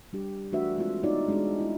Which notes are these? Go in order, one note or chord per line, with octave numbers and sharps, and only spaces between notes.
G3 D4 G4
E3 A3 D4 F#4 B4 E5
G#3 C4 F4
B3 D#4 F4 F#4 C#5 D5
G#3 D4 F#4
E4